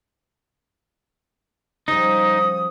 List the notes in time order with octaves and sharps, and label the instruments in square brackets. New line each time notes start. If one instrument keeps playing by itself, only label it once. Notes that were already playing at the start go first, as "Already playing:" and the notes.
[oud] C#3 F3 G3 [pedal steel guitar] D#4 [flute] D#6